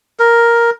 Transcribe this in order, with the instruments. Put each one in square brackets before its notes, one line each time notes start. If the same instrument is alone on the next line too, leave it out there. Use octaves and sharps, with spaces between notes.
[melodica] A#4